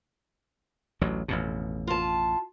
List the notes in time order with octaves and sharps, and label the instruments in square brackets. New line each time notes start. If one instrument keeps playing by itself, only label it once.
[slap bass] A1 D2 F#3
A1 F2 B2
[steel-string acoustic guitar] F4 A5